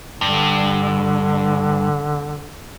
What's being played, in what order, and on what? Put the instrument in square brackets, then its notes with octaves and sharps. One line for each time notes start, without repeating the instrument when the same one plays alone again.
[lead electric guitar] G2 [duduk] D3